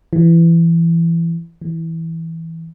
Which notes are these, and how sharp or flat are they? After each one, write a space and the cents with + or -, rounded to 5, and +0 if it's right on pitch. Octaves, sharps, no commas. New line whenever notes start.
E3 +20
E3 -10